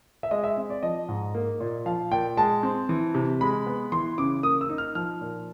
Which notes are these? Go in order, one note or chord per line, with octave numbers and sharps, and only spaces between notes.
E5
G#3 D#5
E5
C4
D5
F3 D#5
G#2
A#3
A#2
F3 F5
A#2 G5
G#3 A5
C4
E3
C3
G#3 B5
B3
E3 C6
C#3 D6
A#3 D#6
E6
D#4
F6
F3 F6
A#2